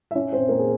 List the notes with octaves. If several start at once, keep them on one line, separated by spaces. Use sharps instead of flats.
E5
C#4 C#5
C4 C5
A#3 A#4
G#4